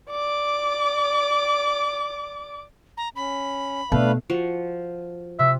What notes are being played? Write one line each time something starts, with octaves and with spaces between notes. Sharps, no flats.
D5 D6
A#5
C#4 B5
B2 A3 D4 B4 F5
F3 F#4 C#7
C3 E5